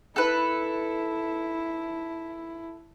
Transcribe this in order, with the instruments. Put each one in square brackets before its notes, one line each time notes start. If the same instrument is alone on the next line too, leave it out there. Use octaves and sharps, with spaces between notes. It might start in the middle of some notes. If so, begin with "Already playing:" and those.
[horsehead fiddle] E4 [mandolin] A4 B4